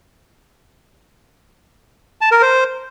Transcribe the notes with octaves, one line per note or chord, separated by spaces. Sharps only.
A5
A#4
C5